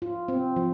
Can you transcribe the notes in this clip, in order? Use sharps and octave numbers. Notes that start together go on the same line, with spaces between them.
F4
C4
F3